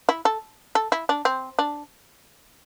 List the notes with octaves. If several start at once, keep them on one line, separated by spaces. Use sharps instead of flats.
E4
A4
A4
E4
D4
C4
D4